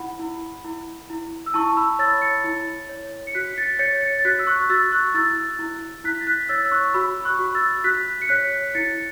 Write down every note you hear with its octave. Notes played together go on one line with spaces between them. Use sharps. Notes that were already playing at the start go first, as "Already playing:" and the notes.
Already playing: E4 F#5 B5
E4
E4
E4
E6
E4 A5 C#6
B5 E6
C#5 E6 A6
A6 C#7
E4
C#5
C#7
F#4 F#6 B6
B6
A6 C#7
C#5 A6 C#7
A6 C#7
A6
F#4 F#6 B6
E6
C#6 F#6
F#6
F#4 E6 A6
C#6 F#6
E4 E6 A6
E4
E4 F#6 B6
A6
F#6 B6
C#5 E6 A6
E6
C#6 F#6
F#4 B5 E6
C#6 F#6
F#4
E6 A6
F#4 F#6 B6
C#7
C#5 F#6 B6
E4 A6 C#7